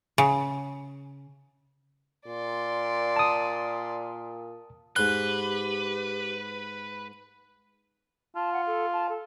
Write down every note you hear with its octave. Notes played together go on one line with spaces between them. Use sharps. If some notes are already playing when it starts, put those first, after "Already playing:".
C#3
A#2 D5 C6
A5 D#6
G#2 G4 B4 C6 F#6
F4 A5
F#5
A4
A5
A4